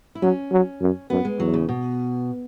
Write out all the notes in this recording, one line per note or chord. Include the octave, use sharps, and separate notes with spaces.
E4
F#3 C#4
F#3
F#2
F#2 B3
G#3
E2 F#3
C#3
B2